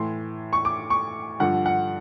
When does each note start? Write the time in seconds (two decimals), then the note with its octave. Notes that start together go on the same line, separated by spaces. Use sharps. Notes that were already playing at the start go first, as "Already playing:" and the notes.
Already playing: A2 E3 C6
0.53 C#6
0.65 D6
0.90 C#6
1.40 G2 D3 F3 F#5
1.66 F#5